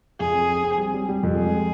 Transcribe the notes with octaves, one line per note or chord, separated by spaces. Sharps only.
F2 G#4
C4
C4
C4
G3
G3
G3
F2
G#3 G#4